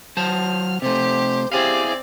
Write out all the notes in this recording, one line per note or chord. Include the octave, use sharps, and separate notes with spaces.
F#3 C5 A5 F6
C3 A3 G4 C5
C4 E4 G4 G#4 D5 F5